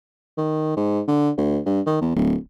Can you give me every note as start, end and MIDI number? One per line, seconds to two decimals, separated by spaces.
0.38 0.75 51
0.77 1.00 44
1.08 1.30 50
1.37 1.59 38
1.66 1.81 43
1.86 1.97 51
2.01 2.15 40
2.16 2.35 26